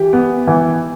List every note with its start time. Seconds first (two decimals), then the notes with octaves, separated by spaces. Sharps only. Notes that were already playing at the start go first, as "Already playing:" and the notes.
Already playing: E3 G4
0.13 B3
0.47 E3